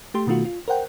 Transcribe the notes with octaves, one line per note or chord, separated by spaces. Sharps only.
A3 G4 C6
B2 D#3 A3 F4 F#4
F4
A#4 C5 F#5 G5